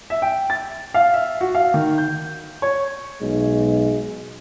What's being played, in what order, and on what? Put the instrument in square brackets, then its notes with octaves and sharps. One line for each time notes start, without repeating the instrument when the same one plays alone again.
[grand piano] E5
G5
A6
F5
E5
F#4
F5
D#3
G6
C#5
[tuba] B1 [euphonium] G#3